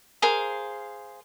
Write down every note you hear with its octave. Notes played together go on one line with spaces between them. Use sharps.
G#4 A#4 C5 F5